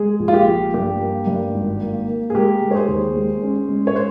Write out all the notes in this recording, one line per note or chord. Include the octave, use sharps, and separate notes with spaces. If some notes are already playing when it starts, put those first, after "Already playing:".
Already playing: G#3 G#4
A#1
F4
G4
F3
G2 G4
A#3
G2
G#1
A#3
A#3
G#4
G#3 G4 A#4
G#3
C#5
G#4 C5
D#2
G#3
C#4
G#3
C#5
C5